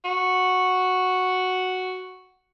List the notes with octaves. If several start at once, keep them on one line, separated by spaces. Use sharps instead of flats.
F#4